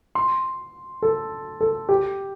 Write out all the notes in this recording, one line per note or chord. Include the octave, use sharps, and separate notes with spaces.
C6
A4
A4
G4